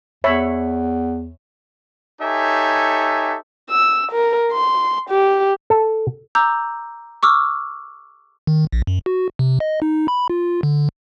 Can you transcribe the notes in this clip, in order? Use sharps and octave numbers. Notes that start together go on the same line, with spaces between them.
E2 C#5 E5 B5
D#4 G4 A4 C#5 E5 G#5
E6
A#4
C6
G4
A4
A#5 D6 E6 G6
C#6 D6 E6 F6
D#3
A#1
F#2
F#4
C3
D#5
D#4
B5
F4
D3